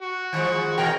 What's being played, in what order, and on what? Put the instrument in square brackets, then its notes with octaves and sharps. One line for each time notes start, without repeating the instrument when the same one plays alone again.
[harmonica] F#4
[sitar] D#3 F3 G#3
[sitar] B2 E3 A#4 [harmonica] G5